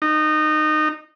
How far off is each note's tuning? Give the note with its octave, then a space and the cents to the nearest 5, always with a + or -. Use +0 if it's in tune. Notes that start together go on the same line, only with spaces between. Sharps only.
D#4 -20